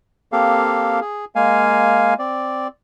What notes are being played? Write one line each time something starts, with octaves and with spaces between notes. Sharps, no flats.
A#3 C4 G4 A4 F5
G#4
G#3 A#3 F5 G#5
C4 D5